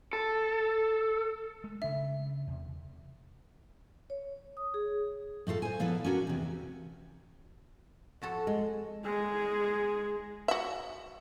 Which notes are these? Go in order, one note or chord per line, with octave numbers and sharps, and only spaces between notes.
A4
G#3 A3
C#3 D4 E5
E2 C3
C#5
D#6
G#4
A2 A3 F4 A4
C5 G#5
A#2 F3 B3 E4 A4
C#4 D4 F#4 A#4
E2 C3
F2 F#4 A4
G#3
G#3 G#4
F#4 E5